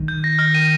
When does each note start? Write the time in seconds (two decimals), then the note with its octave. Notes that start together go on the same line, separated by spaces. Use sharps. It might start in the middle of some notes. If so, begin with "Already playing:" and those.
Already playing: D#3
0.08 G6
0.24 A#6
0.39 F6
0.55 D#7